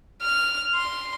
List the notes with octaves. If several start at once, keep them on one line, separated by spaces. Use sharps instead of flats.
F6
C6